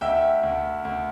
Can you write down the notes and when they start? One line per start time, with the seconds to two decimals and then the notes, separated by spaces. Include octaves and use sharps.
0.01 D2 E5 G5
0.43 D2
0.85 D2